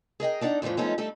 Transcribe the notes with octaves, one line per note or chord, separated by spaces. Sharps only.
G#4 A#4 D#5 G5
D4 D#4 D5 F#5 G5
F2 A2 C3 E3 F3
F3 G#3 A3 B3 C#4 D#4
G3 A3 D#4 A4